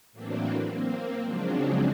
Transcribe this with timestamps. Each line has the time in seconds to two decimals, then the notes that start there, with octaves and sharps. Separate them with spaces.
0.12 A2 E3 F#3 A#3 C4 D4
0.67 A#3 C4
1.24 C#3 F3 F#3 G#3 C4 D4